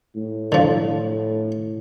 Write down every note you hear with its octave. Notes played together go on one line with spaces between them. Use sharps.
A2
D3 F3